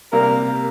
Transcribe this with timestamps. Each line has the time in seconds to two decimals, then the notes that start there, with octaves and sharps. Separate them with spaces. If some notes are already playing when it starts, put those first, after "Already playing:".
0.12 C3 G3 A#3 A#4